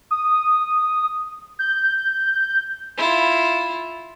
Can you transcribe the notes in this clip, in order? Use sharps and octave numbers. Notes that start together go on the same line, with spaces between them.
D#6
G6
E4 F4